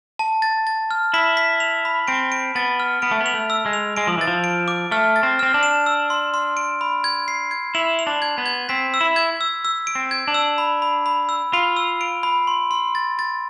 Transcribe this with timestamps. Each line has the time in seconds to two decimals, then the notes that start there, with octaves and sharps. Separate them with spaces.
0.19 A5
0.42 A6
0.67 A6
0.91 F6
1.14 E4 B6
1.37 B6
1.60 F7
1.85 B5
2.08 C4 D7
2.32 D7
2.55 B3 A6
2.80 F6
3.02 B3 D7
3.11 A3
3.20 B3
3.26 F7
3.34 A3
3.50 E6
3.66 G#3
3.73 F7
3.97 G#3 D7
4.07 F3
4.18 E3 A6
4.28 F3
4.44 D7
4.68 D6
4.91 A3 F6
5.16 A6
5.23 C4
5.39 C4 F6
5.54 D4
5.63 E7
5.86 E6
6.10 C6
6.34 C6
6.57 D7
6.81 B5
7.04 G#6
7.28 C7
7.51 G#6
7.75 E4 F7
7.99 F7
8.07 D4
8.22 G#6
8.38 B3
8.46 G#6
8.69 C4 B6
8.94 E6
9.01 E4
9.16 G#6
9.41 E6
9.65 E6
9.87 D7
9.95 C4
10.11 G#6
10.28 D4
10.34 E6
10.58 B5
10.82 B5
11.06 B5
11.29 E6
11.53 F4 B5
11.77 E6
12.01 D7
12.23 B5
12.47 C6
12.71 C6
12.95 A6
13.19 A6